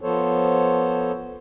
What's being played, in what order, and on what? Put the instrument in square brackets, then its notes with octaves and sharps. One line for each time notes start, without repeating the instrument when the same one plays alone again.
[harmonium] F3 B3 A4 C5 C#5